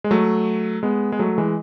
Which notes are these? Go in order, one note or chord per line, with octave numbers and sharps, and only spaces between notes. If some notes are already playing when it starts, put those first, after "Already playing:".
G#3
F#3 A3
G#3 B3
G#3
F#3 A3
E3 G#3